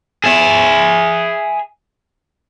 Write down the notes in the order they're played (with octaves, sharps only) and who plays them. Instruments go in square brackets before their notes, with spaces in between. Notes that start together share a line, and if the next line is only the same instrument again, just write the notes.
[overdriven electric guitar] G#4 E5